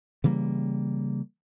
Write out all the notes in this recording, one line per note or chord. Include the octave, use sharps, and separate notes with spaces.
C#3 E3 G3 A#3